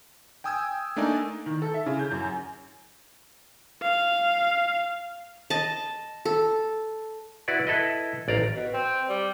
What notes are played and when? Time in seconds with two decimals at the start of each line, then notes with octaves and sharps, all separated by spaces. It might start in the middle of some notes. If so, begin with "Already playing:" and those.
0.44 G5 G#5 D#6 E6 G6 G#6
0.96 A3 A#3 D4 D#4 D5 G#5
1.46 D#3
1.62 A4
1.74 E5
1.86 C#3
1.99 G6
2.11 F#2
3.82 F5
5.50 D#5 A5
6.25 A4
7.48 E4 F#4 B4 D5 F#5
7.67 E4 A4 B4 D#5
8.28 A1 D5 F5 A#5
8.55 B2
8.74 C4
9.09 G3